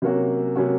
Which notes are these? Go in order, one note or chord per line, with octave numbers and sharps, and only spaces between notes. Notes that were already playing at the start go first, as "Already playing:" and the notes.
C3 F#3 A#3 C#4 F#4
C3 F#3 A#3 C#4 F#4